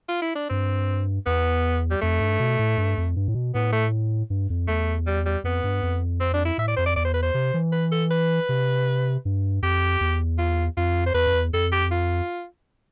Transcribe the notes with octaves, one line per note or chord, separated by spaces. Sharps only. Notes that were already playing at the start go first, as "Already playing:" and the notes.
F4
E4
D4
G2 C4
E2 B3
G3
F2 A3
G2
B2
A2
G2
F2
G2
A2
B2
A2 B3
A3
G2
F2
E2 A3
G3
G3
F2 B3
G2
F2
C4
D4
E4
A2 E5
D5
F2 C5
D5
E2 D5
C5
B4
C5
C3
E3
B4
A4
B4
C3
G2
F2 G4
E2
F4
F2 F4
C5
E2 B4
F2
E2
F2 A4
G4
F4